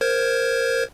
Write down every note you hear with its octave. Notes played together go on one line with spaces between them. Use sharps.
A#4 C5 G#6